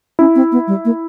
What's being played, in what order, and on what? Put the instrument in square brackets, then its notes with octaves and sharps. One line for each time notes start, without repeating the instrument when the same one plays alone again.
[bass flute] C#4 [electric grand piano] E4
[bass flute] C4
B3
G3
A#3